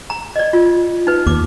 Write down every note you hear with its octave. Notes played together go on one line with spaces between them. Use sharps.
A#5
D5 D#5
F4
D#4 B4
D#2 D6